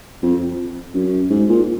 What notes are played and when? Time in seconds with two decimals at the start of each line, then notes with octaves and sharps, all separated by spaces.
0.23 F2
0.94 F#2
1.30 G#2
1.49 A#2